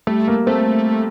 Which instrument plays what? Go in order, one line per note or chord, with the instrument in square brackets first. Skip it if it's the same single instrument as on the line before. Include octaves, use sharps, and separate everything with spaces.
[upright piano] G3 [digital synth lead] A3
[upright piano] A#3
[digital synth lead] A3 [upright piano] C4